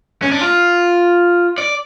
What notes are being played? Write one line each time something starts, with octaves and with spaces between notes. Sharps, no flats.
C#4
D4
F4
D5